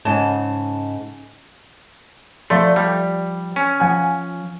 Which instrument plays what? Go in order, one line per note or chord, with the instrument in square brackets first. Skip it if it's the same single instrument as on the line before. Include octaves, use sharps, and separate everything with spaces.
[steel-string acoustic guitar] G#2 C#3 A5
[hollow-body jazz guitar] F3 D5 C6 [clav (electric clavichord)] A3
[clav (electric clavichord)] G3
C#4
[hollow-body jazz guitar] F3 F#5 G#5